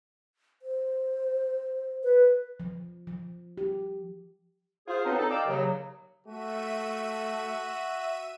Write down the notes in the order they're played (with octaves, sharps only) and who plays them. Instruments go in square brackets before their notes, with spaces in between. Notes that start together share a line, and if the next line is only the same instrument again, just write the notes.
[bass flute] C5
[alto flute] B4
[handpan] F3
F3
G4
[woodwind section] F4 G#4 C5
F#3 B3 C4 D4 D#4
D#4 A4
D5 D#5 F5 G5 D6 E6
D#2 C#3 F#3
[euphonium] A3 [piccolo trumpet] F#4 [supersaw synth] E5 D#7